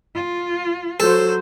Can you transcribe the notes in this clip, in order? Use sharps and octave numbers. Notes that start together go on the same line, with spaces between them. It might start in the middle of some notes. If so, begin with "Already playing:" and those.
F4
F#3 A4 C5